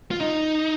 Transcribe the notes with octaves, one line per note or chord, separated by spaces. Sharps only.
F4
D#4